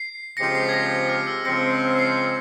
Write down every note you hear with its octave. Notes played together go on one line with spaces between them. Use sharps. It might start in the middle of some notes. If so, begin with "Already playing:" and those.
Already playing: C7
C#3 F3 G#3 C4 G4 A#6 C#7
C7
G#6
A#6
F6
E6
C#3 F3 G#3 C4 A#6 C#7
C7